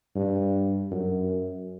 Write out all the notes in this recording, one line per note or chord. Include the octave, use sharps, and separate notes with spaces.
G2
F#2